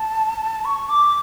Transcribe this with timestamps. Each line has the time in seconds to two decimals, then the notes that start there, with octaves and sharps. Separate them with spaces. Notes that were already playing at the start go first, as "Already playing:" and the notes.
Already playing: A5
0.65 C#6
0.89 D6